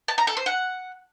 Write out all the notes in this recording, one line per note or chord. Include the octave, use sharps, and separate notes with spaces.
A5
A#5
A4
C5
F#5